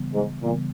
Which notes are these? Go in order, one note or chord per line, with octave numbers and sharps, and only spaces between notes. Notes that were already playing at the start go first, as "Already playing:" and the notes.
Already playing: C#3 E3 G3 B3
G#2
A#2 C#3 E3 G3 B3